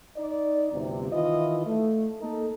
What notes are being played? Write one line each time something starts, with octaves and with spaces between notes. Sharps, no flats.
D#4 D5
G1 D2 C3
D#3 E3 E4 F4 D#5
A3
A#3 D#4 A4